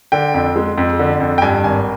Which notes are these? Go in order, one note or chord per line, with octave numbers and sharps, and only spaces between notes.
D3 G5
F2
G#3
F2
D3
F2
G5
G2 G#5
G#1 G#5